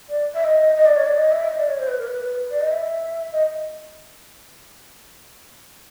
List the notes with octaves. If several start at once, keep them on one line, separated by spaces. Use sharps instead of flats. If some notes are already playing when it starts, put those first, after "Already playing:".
D5
E5
D#5
D#5
D5
C#5
D5
D#5
E5
D#5
D5
C#5
C5
B4
A#4
B4
D5
D#5
E5
D#5